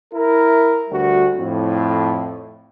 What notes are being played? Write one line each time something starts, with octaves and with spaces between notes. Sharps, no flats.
E4 A#4
D2 G3 F#4
F2 A2